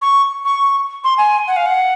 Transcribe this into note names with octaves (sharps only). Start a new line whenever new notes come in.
C#6
C#6
C6
G#5
F#5
F5
F#5